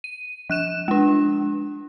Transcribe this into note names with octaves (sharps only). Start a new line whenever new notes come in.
D#7
F3 F#6 E7
G#3 D4